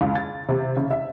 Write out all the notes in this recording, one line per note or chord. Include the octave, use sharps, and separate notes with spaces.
C#2
A6
C3
C#3
E5